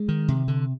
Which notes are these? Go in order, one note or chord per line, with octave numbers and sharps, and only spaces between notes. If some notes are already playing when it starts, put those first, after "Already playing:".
Already playing: G#3
D#3
C3
D3